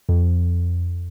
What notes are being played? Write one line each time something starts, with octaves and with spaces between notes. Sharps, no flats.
F2